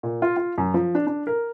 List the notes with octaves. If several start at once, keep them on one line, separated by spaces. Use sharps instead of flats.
A#2
F4
F4
F#2
F3
D4
D4
A#4